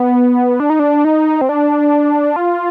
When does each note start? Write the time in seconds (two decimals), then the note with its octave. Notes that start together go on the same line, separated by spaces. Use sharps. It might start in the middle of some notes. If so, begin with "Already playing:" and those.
Already playing: B3
0.60 D4
0.70 D#4
0.79 D4
1.05 D#4
1.41 C4
1.49 D4
2.36 F4